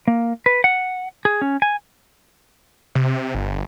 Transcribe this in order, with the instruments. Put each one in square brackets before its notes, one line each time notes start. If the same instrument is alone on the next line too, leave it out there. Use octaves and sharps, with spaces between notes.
[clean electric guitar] A#3
B4
F#5
G#4
C#4
G#5
[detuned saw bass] C3
G1